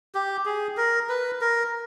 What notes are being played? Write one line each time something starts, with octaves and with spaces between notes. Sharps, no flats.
G4
G#4
A#4
B4
A#4